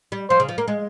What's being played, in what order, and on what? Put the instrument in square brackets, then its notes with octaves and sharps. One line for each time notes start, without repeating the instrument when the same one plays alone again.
[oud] G3
[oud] F3 [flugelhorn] C5
[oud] C#3
F3
A#3
G#3